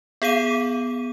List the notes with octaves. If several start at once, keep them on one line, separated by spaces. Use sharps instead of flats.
B3 G#4 F5 D#7